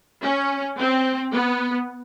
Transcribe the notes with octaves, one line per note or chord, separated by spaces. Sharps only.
C#4
C4
B3